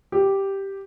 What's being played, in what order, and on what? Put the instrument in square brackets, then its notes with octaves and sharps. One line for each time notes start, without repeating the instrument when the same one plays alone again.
[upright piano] G4